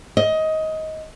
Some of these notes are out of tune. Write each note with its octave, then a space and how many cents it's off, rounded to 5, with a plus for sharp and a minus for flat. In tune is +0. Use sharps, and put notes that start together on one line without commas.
D#5 +20